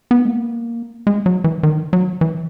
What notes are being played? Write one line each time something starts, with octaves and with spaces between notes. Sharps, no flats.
B3
G#3
A#3
G#3
F#3
E3
D#3
F#3
E3